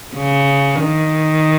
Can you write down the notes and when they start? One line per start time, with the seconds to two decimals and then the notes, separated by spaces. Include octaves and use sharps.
0.14 C#3
0.80 D#3